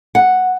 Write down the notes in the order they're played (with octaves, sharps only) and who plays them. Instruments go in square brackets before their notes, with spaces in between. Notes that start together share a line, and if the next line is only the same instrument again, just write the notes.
[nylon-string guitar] F#5